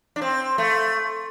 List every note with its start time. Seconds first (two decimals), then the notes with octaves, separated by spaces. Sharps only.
0.16 D4
0.22 C4
0.58 A3